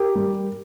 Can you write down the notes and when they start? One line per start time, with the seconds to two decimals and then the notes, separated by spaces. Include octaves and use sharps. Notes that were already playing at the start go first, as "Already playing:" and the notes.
Already playing: G4 A#4
0.15 G3